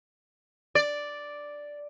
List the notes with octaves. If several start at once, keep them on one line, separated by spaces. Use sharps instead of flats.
D5